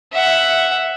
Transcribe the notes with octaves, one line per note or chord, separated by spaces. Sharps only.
E5 F#5